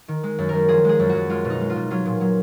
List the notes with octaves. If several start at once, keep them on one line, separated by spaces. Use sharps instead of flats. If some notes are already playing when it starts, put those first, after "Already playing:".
D#3
G#3
F#2
F#2 A#4
F3 G#4
G#3 G#4
F#2
F#4
F#2
G#3 F4
B2
D#4
G#3
F4
B2
F#3 F4
A#2
F#3